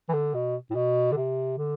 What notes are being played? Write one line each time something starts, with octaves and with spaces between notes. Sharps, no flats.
E3
D3
B2
A2
B2
D3
C3
D3